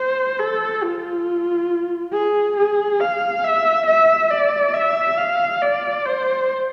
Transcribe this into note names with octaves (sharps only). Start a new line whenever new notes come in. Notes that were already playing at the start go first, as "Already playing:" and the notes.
Already playing: C5
A4
F4
G#4
G#4
F5
E5
E5
D5
E5
F5
D5
C5